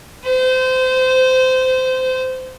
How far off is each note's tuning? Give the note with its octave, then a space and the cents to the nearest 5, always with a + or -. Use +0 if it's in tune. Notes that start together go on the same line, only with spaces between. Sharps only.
C5 -25